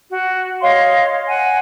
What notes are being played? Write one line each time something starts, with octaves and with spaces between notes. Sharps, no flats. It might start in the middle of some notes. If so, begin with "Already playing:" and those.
F#4
C#5 D#5 F5 C6
F#5 G#5